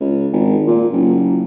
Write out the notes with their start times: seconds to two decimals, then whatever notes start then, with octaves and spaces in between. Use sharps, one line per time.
0.01 C#2
0.33 G#1
0.67 A#2
0.93 F#1